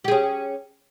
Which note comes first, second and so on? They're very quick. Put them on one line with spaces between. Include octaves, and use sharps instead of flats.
G4 G#4 C#4